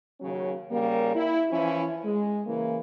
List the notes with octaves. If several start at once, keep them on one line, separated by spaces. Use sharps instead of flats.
D#2 C#3 F#3 C#4
C#3 G3 A#3
E4
E3 F3 C#4 E4
G#3
C#3 E3 A#3